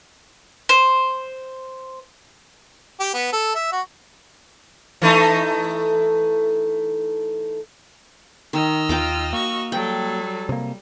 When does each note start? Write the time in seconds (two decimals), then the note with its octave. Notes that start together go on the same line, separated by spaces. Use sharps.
0.69 C5
3.00 G4
3.14 B3
3.32 A4
3.55 E5
3.72 F#4
5.02 E3 A3 D#4
8.53 D#3 D#5 E6 F6
8.89 D#2 F4 G5 A#5 D6
9.33 A#3 F#4 C#6
9.72 F#3 G3 A4 G5
10.49 C3 A#3